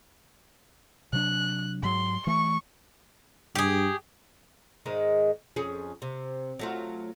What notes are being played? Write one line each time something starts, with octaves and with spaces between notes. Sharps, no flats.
C3 F#3 D4 F#6
G#2 F#3 C6
E3 A3 C#6
G2 G4 G#4
G#2 D#3 G#3
F2 C#4 G#4
C3
F#3 A3 F4